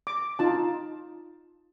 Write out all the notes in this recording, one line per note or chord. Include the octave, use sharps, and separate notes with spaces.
D6
D#4 F4 A5